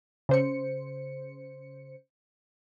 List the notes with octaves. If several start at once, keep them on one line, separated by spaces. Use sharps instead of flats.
C#3 C5 C#7